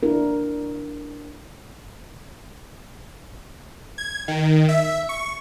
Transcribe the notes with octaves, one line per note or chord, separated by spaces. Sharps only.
D4 E4 A#4
G#6
D#3
E5
C#6